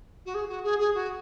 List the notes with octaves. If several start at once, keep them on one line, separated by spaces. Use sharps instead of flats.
F#4
G#4
F#4
G#4
G#4
F#4